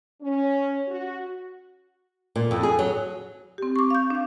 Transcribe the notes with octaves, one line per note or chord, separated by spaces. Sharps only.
C#4
F#4
A#2
F2
G#4
F#3
C4 G4
C#6 D6
F5 G6
D4 F5